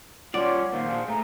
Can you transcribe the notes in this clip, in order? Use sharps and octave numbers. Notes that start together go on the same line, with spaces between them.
G3 C#4 F4 C#5 D5 F#5 C6
A#2 D#3 A#3 C5 F5
A#2 D4 G#4
A2 A3 G#5 A#5